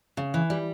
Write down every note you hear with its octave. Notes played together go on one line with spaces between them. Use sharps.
C#3
E3
G3